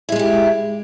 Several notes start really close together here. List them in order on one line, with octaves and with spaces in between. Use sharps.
E4 G#3 F4 G4